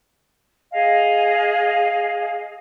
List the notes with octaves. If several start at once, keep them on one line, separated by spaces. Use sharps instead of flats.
G#4 D#5 F5 G#5